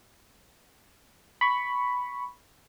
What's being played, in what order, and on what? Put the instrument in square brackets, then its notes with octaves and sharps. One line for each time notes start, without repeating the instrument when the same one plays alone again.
[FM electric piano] B5 C#6